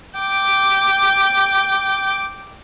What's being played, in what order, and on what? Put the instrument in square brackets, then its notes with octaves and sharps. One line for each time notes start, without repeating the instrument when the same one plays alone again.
[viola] G5 D6